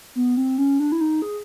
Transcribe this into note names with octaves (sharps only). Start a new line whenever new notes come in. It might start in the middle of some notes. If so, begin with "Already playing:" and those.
B3
C4
C#4
D4
E4
D#4
G#4